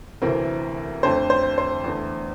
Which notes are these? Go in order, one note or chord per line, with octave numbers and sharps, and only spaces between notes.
D2 C3 E3 A3 C4 A#4
F2 D3 A3 C5
C5
C5
E2 D3 A3